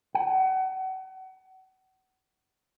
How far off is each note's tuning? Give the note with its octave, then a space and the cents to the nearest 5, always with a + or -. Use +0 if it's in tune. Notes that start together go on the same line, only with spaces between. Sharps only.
F#5 +35